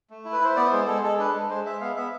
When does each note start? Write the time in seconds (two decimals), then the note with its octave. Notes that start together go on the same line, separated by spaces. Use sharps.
0.10 A3
0.25 E4
0.32 B4
0.41 E4 C5
0.56 B3 D5
0.71 G#3 C5
0.87 G#3 A4
1.03 G#3 A4
1.19 D4 B4
1.35 G#3
1.49 G#3 C5
1.65 G#3 E5
1.81 B3 F5
1.96 B3 E5